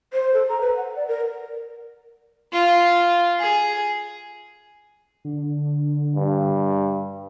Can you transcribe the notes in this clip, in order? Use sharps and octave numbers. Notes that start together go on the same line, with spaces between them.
C5
A4
A#5
B4
F#5
D5
A#4
F4
G#4
D3
G2